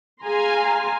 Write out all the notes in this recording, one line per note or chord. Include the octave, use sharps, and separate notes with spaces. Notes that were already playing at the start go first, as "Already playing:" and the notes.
G#4 F5 G#5 A#5 C6